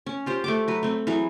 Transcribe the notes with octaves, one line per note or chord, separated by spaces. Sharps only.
C#4
F4 G4 C5
A3 C5 D6
F#3 B4
A3 C4
E3 F#3 G#4